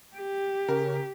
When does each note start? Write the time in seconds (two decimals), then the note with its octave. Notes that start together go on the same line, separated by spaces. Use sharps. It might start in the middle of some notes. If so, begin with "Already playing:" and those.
0.17 G4
0.69 C#3 A#4